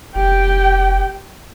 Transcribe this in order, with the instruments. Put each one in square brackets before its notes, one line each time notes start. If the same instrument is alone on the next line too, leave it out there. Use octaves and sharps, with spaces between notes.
[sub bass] F1 [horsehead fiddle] G4 G5